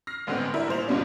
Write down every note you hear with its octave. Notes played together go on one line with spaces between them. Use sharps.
F6 A#6 C7
A1 G#2 D3 B3 C4
G3 D4 E4 A#4 E5
A1 A#2 C5 F7
D#2 G#2 B2 F3 G3 C#4